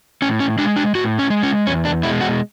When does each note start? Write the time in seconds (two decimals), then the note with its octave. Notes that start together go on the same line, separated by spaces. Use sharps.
0.22 A2 C#4
0.40 C#4
0.58 G#3 D4
0.76 D4
0.95 A2 F#4
1.19 C#4
1.30 G#3
1.43 C#4
1.67 E2 C#4
1.85 D4
2.03 B2 G#3 E4
2.21 F#4